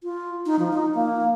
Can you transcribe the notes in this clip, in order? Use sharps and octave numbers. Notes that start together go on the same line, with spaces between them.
F4
D#4
F3
D#4
A#3